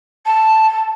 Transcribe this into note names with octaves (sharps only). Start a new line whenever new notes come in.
A5